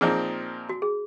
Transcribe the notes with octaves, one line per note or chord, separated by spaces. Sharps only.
A#2 F3 C4 D#4 G#4 A#4
F#4
G#4